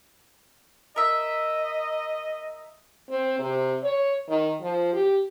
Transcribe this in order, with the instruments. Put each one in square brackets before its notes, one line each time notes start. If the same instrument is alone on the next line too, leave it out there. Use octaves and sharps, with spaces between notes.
[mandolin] A#4 E5 [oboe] D#5
[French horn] C4
C3
C#5
D#3
F3
G4